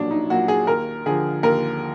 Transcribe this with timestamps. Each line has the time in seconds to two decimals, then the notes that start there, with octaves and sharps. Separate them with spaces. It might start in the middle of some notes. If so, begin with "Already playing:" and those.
Already playing: A#1 A#2 F#3 D4
0.11 D#4
0.30 A#2 F#3 F#4
0.48 G#4
0.67 D#2 A#4
1.06 D3 F3 G#4
1.43 D#2 A#4